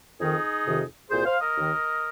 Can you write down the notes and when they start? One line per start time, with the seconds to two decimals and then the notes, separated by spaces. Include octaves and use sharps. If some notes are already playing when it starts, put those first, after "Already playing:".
0.19 F2 D#3 D#4 G#4
0.65 F2 C3 D#3
1.10 C2 A#2 G#4 C5
1.25 C5 F5
1.40 A#4 D#5
1.56 D#2 D#3